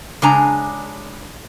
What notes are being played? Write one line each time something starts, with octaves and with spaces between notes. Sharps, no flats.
C#3 G#3 D4 G#5 A#5